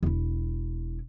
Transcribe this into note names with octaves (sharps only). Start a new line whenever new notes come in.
E1 E4